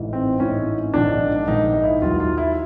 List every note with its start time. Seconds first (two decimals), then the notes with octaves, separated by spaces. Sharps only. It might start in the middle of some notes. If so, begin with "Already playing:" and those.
Already playing: A1 G#2 E3
0.13 C4
0.40 A1 G#2 E3 C#4
0.94 A#1 G#2 D#3 D4
1.48 A#1 G#2 D#3 D#4
1.73 D#4
1.84 E4
2.02 D#2 D#3 F#3 F4
2.20 F4
2.38 E4